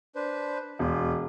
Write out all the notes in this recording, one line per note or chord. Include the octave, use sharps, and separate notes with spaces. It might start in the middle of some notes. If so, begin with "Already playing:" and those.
D4 B4 C5
E1 F4